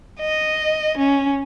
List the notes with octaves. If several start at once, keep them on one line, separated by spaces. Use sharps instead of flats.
D#5
C#4